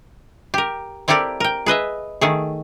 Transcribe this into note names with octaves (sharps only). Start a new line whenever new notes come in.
G4 A#4
C4 E4 G4 A4 A#4 D5
A#4 G5
G#4 B4 D#5 E5
D#3 A3 G#4